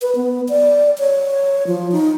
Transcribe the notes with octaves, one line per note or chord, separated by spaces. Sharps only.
B4
B3
D5
C#5
F3
D#4